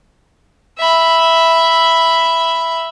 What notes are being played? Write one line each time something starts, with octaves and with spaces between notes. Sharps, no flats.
E5 B5